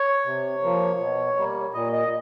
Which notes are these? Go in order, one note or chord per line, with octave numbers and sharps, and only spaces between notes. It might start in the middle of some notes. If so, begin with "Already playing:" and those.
Already playing: C#5
C3
F3 A#3
B2
G3 A#3
A#2 D#5
D#5